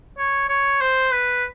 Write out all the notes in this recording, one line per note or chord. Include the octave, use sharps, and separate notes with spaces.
C#5
C#5
C5
B4